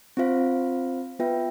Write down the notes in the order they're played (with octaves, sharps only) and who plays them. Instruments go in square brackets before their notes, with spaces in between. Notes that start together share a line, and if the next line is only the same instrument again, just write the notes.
[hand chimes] C4 F4 C5 F5
B3 F4 B4 E5 G5